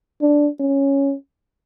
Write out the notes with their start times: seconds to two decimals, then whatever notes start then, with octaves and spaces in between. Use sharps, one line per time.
0.21 D4
0.60 C#4